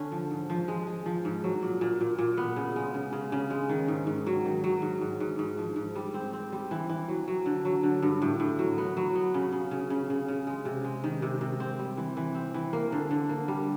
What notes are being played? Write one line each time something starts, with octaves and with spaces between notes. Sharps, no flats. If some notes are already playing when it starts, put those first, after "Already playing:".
Already playing: D3 C#4
F3
G#2
F3
G#3
G#3
F3
G#2
F#3
A#2
A#2
A#2
A#2
B3
C#3
G#3
C#3
C#3
C#3
G#3
D#3
G#2
G#2
F#3
D#3
F#3
G#2
G#2
G#2
G#2
F3
G#2
G3
C4
C4
G3
E3
E3
F#3
F#3
D3
F#3
D3
G2
A2
A2
F#3
B3
F#3
B3
C#3
C#3
C#3
C#3
C#3
C#3
G#3
C3
G#3
D#3
C3
C3
C4
G3
E3
E3
C4
E3
A#3
D3
D3
A#3
G3